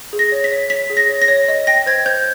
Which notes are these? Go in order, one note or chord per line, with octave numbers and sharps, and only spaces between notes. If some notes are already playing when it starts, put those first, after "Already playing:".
G#4
A#6
C#5
B6
C#5
C#5 B6
G#4
A#6
C#5
A#6
C#5
D#5
G5 A#6
C5 G#6
C5 G6